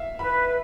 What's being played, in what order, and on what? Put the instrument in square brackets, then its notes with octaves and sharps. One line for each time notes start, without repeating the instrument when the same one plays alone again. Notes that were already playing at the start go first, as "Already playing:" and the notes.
Already playing: [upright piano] E5 F5
[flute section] B4 [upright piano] B5